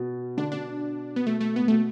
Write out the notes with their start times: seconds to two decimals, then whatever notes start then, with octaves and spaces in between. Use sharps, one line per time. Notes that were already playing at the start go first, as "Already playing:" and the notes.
Already playing: B2
0.37 D3 D4
0.52 B2 D4
1.16 B3
1.26 B2 A3
1.41 A3
1.55 A2 B3
1.68 B2 A3